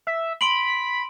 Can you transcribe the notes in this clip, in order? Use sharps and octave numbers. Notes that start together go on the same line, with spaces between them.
E5
B5 C6 D7 F#7